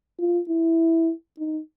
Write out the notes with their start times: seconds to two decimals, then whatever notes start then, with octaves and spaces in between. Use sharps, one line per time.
0.19 F4
0.49 E4
1.39 D#4